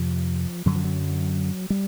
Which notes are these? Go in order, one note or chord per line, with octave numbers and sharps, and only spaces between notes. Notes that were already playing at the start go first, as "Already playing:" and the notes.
Already playing: F2 C3 F3
F#2 D3 F#3
F3
F#3
G3